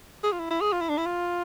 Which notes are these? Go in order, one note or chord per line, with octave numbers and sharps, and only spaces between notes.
G#4
F4
E4
E4
G#4
F4
E4
D4
E4
F4